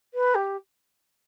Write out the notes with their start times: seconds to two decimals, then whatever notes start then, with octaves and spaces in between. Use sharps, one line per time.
0.14 B4
0.35 G4